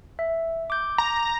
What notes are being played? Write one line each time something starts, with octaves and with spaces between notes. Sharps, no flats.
E5
D6 G6
A#5